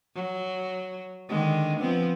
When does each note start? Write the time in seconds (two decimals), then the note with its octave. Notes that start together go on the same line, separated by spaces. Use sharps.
0.15 F#3
1.29 D3 D#3 G#3
1.80 F3 B3 C4